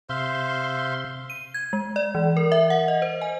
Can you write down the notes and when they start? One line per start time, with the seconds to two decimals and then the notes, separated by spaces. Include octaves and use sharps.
0.09 C3 C5 E5 F5 C6
1.30 D#7
1.54 G#6
1.73 G#3
1.96 D5
2.15 E3
2.37 A#4
2.52 E5
2.70 F#5
2.88 D#5
3.02 C5
3.22 G#5